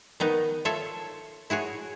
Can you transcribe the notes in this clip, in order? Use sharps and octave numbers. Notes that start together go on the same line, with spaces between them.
D#3 B3 D#4
F4 A4 C#5 E5
E4 F#4 G#4 C#5